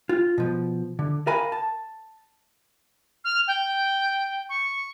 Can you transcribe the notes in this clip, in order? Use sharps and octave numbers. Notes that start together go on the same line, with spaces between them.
F4
B2 F3
D3
A#4 F5 G#5 A#5 B5
A5
F6
G5
C#6